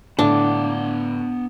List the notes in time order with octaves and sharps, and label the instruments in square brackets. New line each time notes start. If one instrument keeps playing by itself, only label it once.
[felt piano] A2 D3 [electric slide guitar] B3 F5 F#5 [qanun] D4